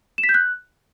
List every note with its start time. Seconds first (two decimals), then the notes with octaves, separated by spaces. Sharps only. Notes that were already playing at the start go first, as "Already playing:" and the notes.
0.18 E7
0.24 B6
0.29 G6
0.34 F#6